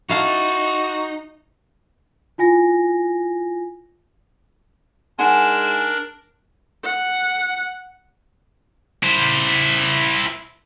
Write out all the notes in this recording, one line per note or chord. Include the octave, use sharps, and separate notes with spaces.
D#4 E4 F#4 F5 A5
E4 F4 G#5 A#6
G#3 D4 D#4 A#4 F#5 G#5 E7
F#5
E4 C5